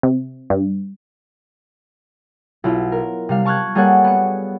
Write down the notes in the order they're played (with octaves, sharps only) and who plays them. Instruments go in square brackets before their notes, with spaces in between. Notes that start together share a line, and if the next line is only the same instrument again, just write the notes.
[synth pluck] C3
G2
[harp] B1 E4 F4
A#4
C3 G3 F5
A5 C#6 F6 F#6 G#6
G3 A#3 G#4 A4 C#5 F#5
B3 C#7